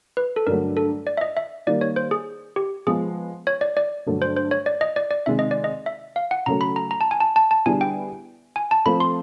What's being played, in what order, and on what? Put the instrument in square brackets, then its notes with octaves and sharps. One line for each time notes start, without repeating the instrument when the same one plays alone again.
[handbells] B4
A4
[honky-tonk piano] G2 D3 F#3 A3 [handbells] A#4
[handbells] A4
D5
E5
D#5
E5
[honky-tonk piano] D#3 G3 A#3 [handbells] D5
[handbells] C#5
C5
G#4
G4
[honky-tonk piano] F3 G#3 B3 [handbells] G#4
[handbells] C#5
D5
D5
[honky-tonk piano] G2 D3 F#3 A3
[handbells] C5
C5
C#5
D5
D#5
D5
D5
[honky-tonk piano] C3 D#3 G#3 [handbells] E5
[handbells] D#5
D5
D#5
E5
F5
F#5
[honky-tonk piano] C#3 F#3 A3 [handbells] A#5
[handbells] B5
A#5
A#5
A5
G#5
A5
A5
A5
[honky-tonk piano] D3 G3 B3 E4 G#4 [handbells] G#5
[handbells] G5
G#5
A5
[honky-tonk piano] F3 A3 C4 [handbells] B5
[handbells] C6